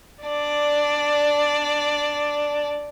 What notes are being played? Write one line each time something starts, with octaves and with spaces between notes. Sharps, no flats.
D4 D5